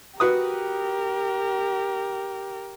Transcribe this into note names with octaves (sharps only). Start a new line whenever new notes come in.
F#4 G4 A#4 B4 D#6